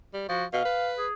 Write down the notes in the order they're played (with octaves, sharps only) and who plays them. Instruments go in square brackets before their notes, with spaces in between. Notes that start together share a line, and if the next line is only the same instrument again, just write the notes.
[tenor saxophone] G3
[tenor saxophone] F3 [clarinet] F#4
[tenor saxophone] B2 [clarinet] F5
[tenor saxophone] B4
[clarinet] G#4